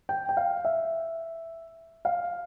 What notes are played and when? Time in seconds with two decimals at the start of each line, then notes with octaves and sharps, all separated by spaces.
0.09 G5
0.29 G5
0.37 F5
0.65 E5
2.05 F5